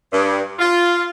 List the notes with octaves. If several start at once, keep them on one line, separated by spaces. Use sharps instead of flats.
G2
F4